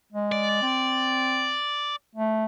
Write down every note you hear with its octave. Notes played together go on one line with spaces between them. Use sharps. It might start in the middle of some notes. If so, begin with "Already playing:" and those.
G#3
D5
C4
A3